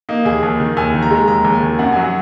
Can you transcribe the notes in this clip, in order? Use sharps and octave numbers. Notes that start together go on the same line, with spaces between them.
A#3 D#4
D#2 G#4
D#2
D#3
D#2 G#5
D#3
A#5
G#3
D#2 A#5
D#2
G#5
D#3
F#2 F#5
F#3 G#5
F#5